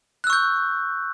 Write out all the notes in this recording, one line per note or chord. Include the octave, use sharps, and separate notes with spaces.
C#6 E6 F#6 G6